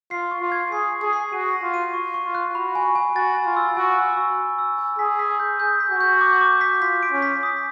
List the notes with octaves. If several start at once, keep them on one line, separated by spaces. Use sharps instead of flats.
F4 C7
C#6
F4
G#6
G#4 C7
C#6
G#4
C7
F#4 D#7
A#6
F4
D#7
C#6
C#6
F4
F#6
F#4 B5
G#5
G#5
F#4 A6
G#5
F4
E6
F#4 G#5
E6
C#6
C#6
E6
G#5
G#4 B6
B6
G6
G#4 G6
B6
F#4
G6
D6
D6
B6
F4 B6
D7
C#4
B6
D#6